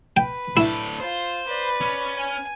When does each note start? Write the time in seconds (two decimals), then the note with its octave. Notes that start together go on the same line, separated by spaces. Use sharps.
0.17 B4 G5
0.57 A2 D4 E4
1.00 F4 C5
1.47 B4 D5
1.81 C#4
2.16 G#5